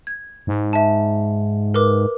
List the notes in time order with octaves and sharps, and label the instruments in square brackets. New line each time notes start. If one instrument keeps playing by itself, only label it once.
[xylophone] G#6
[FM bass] G#2
[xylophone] E5 A5
A#4 B4 D6